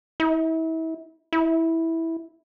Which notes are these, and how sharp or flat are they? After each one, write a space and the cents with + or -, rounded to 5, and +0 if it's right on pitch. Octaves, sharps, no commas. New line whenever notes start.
E4 -35
E4 -10